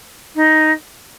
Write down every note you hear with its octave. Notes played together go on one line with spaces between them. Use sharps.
D#4